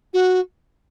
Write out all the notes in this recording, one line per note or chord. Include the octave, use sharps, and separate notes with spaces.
F#4